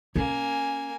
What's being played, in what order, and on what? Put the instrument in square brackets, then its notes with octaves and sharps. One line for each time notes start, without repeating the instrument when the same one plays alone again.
[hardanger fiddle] A#3 G#5 [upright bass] C#4